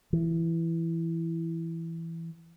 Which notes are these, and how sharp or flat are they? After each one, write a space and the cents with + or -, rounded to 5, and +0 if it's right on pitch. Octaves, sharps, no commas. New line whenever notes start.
E3 +5